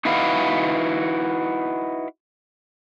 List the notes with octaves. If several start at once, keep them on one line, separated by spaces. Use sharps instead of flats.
D#4 E4 F#4 B4 F5